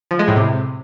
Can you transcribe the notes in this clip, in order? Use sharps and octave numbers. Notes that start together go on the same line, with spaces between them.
F3
G#3
A2
C3